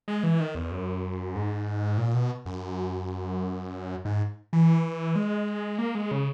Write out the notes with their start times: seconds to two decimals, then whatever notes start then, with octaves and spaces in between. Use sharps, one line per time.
0.08 G#3
0.23 E3
0.40 D#3
0.55 E2
0.71 F#2
1.35 G#2
1.98 A#2
2.14 B2
2.46 F#2
4.05 G#2
4.53 E3
5.16 G#3
5.78 A#3
5.95 G#3
6.11 C#3